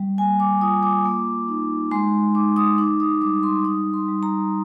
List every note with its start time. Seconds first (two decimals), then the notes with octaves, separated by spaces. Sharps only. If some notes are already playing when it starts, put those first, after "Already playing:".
Already playing: G3
0.18 A#3 G#5
0.40 D6
0.61 F4 D#6
0.83 D6
1.05 A#3
1.48 D#4
1.91 G#3 C6
2.35 D#4 D6
2.56 D#6
2.78 D#4 D6
3.00 D#6
3.21 G3 D6
3.43 C6
3.65 D#4 D#6
3.94 C6
4.08 G3
4.23 A#5